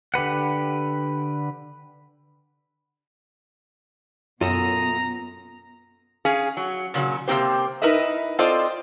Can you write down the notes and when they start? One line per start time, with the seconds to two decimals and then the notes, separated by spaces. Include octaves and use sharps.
0.14 D3 G4 B4 F#5
4.41 F#2 B2 B3 F4 A4 A#5 D#6
6.25 C#4 G#4 F5
6.57 F#3
6.94 A#2 C#3 F#3
7.28 C3 E3 A#3 C4 G4 C5
7.82 D#4 E4 A#4 B4 D#5 E5
8.39 C4 F4 A4 C5 D5 D#5